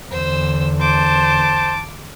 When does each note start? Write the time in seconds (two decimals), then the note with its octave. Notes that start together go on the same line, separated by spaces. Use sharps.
0.11 E2 D3 C5 E6
0.80 C5 A5 D6